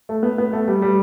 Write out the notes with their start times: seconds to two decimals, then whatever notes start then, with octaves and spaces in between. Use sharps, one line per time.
0.09 A3
0.23 B3
0.38 B3
0.53 A3
0.68 G3
0.82 G3